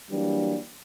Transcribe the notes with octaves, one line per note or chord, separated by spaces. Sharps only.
E3 F#3 G3 A#3 D4